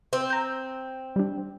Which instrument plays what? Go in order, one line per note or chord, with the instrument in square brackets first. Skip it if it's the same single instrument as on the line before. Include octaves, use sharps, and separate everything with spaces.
[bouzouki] C4
[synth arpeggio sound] A#5 G6
G3 D4